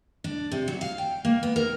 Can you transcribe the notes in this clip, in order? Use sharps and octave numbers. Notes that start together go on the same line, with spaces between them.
D4
C3
F#3
F5
G5
A#3
B3
A#4